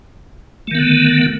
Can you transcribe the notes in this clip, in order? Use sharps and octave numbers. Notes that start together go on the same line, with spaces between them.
D3 D#3 A3 B3